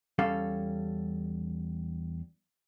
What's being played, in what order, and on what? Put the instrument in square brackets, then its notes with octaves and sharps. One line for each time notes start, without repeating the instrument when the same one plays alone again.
[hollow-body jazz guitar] E2 G3 C#4 A4 F5